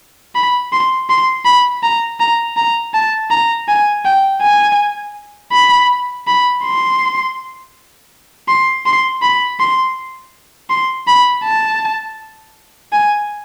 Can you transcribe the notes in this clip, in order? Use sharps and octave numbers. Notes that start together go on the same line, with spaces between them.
B5
C6
C6
B5
A#5
A#5
A#5
A5
A#5
G#5
G5
G#5
B5
B5
C6
C6
C6
B5
C6
C6
B5
A5
G#5